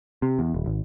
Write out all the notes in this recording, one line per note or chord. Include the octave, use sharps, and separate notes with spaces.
C3
E2
D#1
G#1